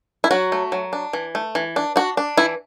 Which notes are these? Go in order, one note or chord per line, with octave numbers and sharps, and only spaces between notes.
E4
F#3 F#4
A3
F#3
D4
E3
A3
E3
D4
D4 F#4
D4
E3 E4